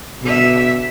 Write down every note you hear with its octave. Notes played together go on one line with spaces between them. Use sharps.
B2 D3 E5